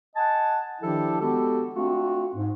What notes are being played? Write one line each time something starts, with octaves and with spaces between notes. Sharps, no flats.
D#5 F#5 G#5 A5
D#3 F3 D4 E4 G4 A4
G#3 B3 F#4 G4 A4
A3 C4 D4 F4 F#4
G#2